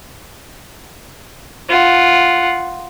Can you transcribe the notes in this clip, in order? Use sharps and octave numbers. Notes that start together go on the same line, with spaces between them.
F4 F#5